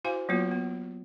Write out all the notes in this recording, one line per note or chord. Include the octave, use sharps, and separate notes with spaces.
E4 F#4 C5 F5 G#5
F#3 A#3 B3 F4 F#4
B3